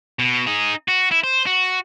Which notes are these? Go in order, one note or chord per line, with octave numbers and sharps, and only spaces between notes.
B2
D#4 G#4
F#4
E4
C5
F#4